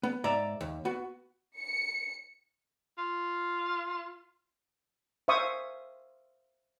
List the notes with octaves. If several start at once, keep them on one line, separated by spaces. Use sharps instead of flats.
B3
G#2 D5 E5 A#5
D#2
B3 F#4
C#7
F4
C5 E5 F5 C#6 D#6